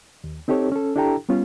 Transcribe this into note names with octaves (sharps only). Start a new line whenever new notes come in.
D#2
C4 D#4 G4 A4 C#5
C#4 A4
D4 E4 G4 A4 G5 A#5
G3 B3 C#4 F4